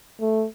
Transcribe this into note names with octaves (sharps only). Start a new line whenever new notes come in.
A3